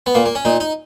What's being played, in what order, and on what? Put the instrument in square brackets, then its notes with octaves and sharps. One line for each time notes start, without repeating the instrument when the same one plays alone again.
[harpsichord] B3
A#2 A#3
A#3
C#4
A#2 D#4
D#4